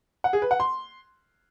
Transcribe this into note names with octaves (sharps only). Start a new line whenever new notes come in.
F#5
G#4
B4
F#5
C6